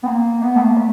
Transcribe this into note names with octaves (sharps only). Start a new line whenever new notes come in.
B3
A#3
B3
A3
A#3
A3